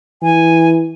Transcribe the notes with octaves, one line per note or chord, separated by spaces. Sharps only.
E3 G#5